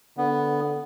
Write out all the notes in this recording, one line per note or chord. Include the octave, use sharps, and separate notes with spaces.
D3 B3